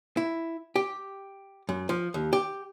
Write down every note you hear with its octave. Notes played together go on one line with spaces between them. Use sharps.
E4
G4
F#2
F3
D#2
G4